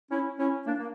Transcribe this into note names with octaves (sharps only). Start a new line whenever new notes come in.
C#4 E4
C#4 E4
A#3 D4
A#3